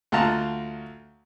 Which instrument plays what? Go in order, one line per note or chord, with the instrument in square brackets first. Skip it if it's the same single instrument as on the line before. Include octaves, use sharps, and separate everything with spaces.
[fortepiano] D2 F4 F#5 A5 A#5